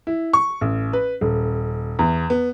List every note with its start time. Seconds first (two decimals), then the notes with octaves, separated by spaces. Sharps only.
0.07 E4
0.33 C#6
0.61 A1
0.93 B4
1.21 D#1
1.99 E2
2.30 B3